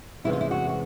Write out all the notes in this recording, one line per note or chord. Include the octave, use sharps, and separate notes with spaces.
E2 C3 E3 G#3 C#4 E4
F4
E4
F#4
F#4